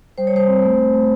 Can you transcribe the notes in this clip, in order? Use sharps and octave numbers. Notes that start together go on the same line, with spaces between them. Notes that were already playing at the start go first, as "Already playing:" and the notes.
G3 C5
C#5
G3 C5
C4
A3
A3
A3